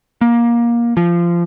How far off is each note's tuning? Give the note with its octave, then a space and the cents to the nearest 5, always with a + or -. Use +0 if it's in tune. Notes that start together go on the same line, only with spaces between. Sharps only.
A#3 +20
F3 -20